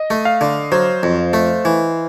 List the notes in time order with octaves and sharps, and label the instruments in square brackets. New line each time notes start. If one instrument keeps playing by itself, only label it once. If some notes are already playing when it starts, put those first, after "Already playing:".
Already playing: [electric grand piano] D#5
[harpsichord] A3
[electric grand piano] F5
[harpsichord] D3
[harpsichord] F#3 [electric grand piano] C5
[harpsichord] F2
A3
E3